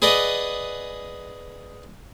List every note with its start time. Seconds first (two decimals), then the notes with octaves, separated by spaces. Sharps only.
0.02 G#4 B4 D5 D#5 F#5